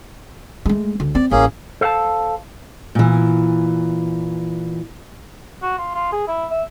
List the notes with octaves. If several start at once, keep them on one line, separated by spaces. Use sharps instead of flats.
G#3 A3
D2
C4 D5
A1 A#3 C#4 G#4
A4 C5 F5 F#5 A5
A#2 E3
F#4
F4
F4
G#4
E4
E5